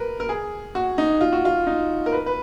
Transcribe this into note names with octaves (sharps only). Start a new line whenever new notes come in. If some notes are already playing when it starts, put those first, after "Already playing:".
Already playing: A#4 B4
A#4
G#4
F#4
D#4
F4
F#4
F4
D#4
A#4
B4
B4